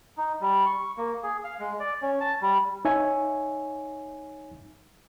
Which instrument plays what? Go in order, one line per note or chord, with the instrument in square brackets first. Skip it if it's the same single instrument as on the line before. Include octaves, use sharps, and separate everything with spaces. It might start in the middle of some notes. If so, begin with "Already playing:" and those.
[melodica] D#4
G3
C#6
A#3
G#4
F5
G#3
D5
C#4
A5
G3
[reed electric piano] D#4 C#5 E5 G#5